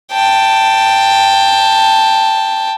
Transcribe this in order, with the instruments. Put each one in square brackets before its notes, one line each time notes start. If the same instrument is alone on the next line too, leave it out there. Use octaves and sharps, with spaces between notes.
[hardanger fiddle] G5 A5